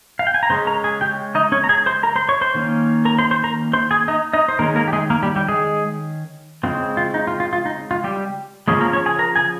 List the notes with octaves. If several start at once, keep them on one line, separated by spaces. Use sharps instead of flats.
F5
G5
G#5
A#5
C#3 G#3 C#4 C5 C6
A#4 A#5
G#4 G#5
G4 G5
D#4 D#5
C#4 C#5
A#5
G#4 G#5
C5 C6
A#4 A#5
C5 C6
C#5 C#6
C5 C6
D#3 A#3 C#4
A#4 A#5
C5 C6
C5 C6
A#4 A#5
C5 C6
G#4 G#5
D#4 D#5
D#4 D#5
C5
D#3 G#3 A#3 C#4 A#4
A#3 A#4
G4
G#3 G#4
A#3 A#4
G3 G4
G3 G4
G#3 G#4
C#3 G#3 C4 F4
F4
D#4
F4
F4
F4
D#4
F4
G3 G4
C#3 F3 G#3 A#3 C#4 G#4
A#3 A#4
C#4 C#5
G#4 G#5
A#4 A#5
G#4 G#5